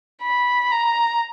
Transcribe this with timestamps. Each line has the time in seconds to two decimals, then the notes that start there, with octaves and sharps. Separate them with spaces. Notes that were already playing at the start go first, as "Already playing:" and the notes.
0.22 B5
0.72 A#5